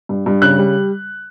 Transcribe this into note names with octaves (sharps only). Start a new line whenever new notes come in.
G2
G2
C#3 F#6
G3